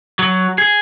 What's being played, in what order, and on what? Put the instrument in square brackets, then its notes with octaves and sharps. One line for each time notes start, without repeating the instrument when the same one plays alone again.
[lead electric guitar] F#3
G#4